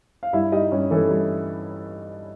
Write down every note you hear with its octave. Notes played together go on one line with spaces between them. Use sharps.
F5
G2 E4 E5
G3 D#4 D#5
G2 C#4 C#5
E3 A3 A4
G2